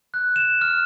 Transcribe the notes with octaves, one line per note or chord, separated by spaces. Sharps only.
F#6
E7
F6